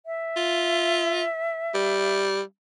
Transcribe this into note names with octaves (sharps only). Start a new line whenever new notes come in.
E5
F4
G3